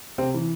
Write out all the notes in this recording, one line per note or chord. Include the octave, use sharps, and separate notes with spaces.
C3 C4
E3